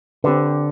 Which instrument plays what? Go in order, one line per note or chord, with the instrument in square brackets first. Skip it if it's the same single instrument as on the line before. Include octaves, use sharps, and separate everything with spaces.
[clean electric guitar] D3 [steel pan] C4 G4 B4